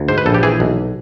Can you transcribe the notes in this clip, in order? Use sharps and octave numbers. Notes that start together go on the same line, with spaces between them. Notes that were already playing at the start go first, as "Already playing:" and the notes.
Already playing: D2
G#2 C5
B4
A#1 A4
G4
E3 G#4
B1